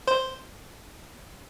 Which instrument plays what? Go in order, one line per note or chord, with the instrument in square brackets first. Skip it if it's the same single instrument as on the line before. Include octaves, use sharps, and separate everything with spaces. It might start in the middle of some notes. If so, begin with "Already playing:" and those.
[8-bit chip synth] C5